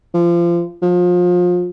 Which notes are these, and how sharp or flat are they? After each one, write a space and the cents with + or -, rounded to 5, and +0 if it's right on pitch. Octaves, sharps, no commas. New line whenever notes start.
F3 -25
F3 +30